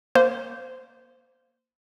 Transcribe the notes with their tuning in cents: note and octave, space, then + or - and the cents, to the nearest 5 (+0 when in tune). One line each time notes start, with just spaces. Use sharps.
A#3 +0 C5 -15